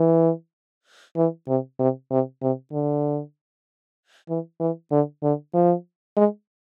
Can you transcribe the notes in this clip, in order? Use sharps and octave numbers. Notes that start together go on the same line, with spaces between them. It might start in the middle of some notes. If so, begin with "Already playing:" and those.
Already playing: E3
E3
C3
C3
C3
C3
D3
E3
E3
D3
D3
F3
G#3